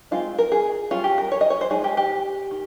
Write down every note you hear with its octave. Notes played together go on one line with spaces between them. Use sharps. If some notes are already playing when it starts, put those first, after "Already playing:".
G#3 C4 D#4 F4
A#4
G#4
G3 C#4 F4
G4
A#4
C#5
D#5
C#5
C5
F3 G#3 D#4 G#4
G4
G4
D#3